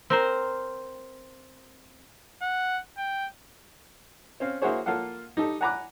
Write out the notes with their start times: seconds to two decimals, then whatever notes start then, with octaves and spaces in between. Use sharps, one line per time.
0.10 C4 A#4 C5
2.42 F#5
2.97 G5
4.40 C4 C#4 F5
4.62 A#3 E4 F#4 G#4 C5 C#5
4.86 A#3 F4 A4 F5 F#5
5.37 D#4 G4 A4
5.61 F#5 G#5 A#5 B5 D6 F#6